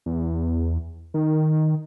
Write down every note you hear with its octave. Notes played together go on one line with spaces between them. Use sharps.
E2
D#3